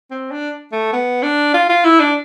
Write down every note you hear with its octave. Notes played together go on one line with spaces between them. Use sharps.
C4
D4
A3
B3
D4
F4
F4
E4
D4